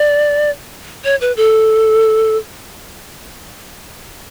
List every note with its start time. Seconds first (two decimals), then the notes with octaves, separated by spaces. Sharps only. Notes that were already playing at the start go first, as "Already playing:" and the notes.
Already playing: D5
1.04 C#5
1.21 B4
1.37 A4